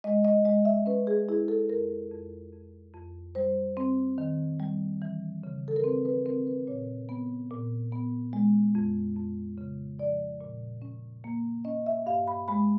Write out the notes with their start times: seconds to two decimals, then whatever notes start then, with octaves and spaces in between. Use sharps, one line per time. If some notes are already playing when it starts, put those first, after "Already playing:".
0.04 G#3 D#5
0.25 D#5
0.45 G#3 D#5
0.65 E5
0.86 C#4 B4
1.07 G#4
1.29 E4 G#4
1.48 A4
1.69 F2 A#4
2.11 F2
2.53 F2
2.94 F2
3.35 G3 C5
3.77 C4
4.18 D#3
4.60 G3
5.02 E3
5.44 C#3
5.68 A4
5.76 A#4
5.84 C4 B4
6.05 B4
6.26 C4 A#4
6.47 B4
6.67 A#2 C#5
7.09 B3
7.51 A#2
7.92 B3
8.33 G#3
8.75 F2
9.16 F2
9.58 C#3
9.99 F3 D5
10.41 A#2
10.82 C#4
11.24 A#3
11.65 C#4 D#5
11.86 E5
12.06 G2 F5
12.27 B5
12.48 G#3 B5